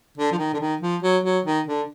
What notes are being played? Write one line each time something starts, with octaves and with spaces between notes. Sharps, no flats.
D3
F3
D#3
D3
D#3
F3
F#3
F#3
D#3
D3